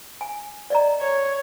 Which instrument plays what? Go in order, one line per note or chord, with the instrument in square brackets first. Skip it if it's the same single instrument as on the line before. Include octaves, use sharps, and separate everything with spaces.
[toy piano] G#5
D5 D#5 A#5
[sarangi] C#5